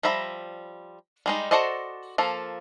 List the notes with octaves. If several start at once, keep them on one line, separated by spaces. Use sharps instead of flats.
F3 G3 E5 A#5 B5
G3 G#3 D#4
F#4 A4 C5 D5 D#5
F3 A#3 A4